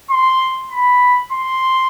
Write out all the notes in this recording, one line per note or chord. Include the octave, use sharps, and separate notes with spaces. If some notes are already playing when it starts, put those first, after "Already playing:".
C6
B5
C6